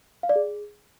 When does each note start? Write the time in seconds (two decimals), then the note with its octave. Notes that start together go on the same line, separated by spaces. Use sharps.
0.23 F5
0.29 D5
0.36 G#4